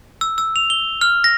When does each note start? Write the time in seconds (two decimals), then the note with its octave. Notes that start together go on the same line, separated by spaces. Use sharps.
0.21 E6
0.38 E6
0.56 F7
0.70 G7
1.01 F6
1.24 A#6